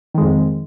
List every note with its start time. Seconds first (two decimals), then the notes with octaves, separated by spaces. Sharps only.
0.14 D#3
0.18 G#3
0.21 F2